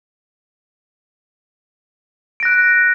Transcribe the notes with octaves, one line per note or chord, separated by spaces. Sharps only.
F#6 A#6 D7